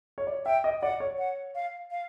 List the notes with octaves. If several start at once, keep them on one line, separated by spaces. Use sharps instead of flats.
C#5
D5
E5 G5
D#5
D5 F#5
C#5
F#5
F5
F5